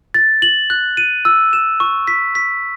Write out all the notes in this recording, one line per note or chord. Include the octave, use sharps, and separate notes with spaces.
A6
F#7
F#6
D#7
E6
E7
C#6
B6
B6